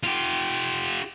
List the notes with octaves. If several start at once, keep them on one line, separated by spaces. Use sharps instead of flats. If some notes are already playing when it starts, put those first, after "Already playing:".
F4 G4